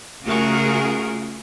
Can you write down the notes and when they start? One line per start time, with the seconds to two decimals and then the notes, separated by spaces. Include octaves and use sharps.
0.25 C#3 A3 F4 F#4 G#4 A#4